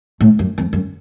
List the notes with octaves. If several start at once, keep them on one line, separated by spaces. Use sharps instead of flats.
A2
F#2
F2
F#2